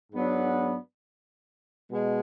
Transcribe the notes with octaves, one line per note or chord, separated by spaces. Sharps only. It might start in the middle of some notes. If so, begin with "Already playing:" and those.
G#2 F#3 B3 D4
B2 G#3